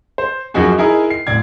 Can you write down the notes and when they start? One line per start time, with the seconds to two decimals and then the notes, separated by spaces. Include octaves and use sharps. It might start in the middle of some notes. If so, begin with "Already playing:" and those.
0.18 C5
0.54 F#2 F3 C#4 D#4 F#4 G#4
0.78 D#4 E4 G#4 A#4 D#5
1.10 C7
1.27 D1 D5 G#6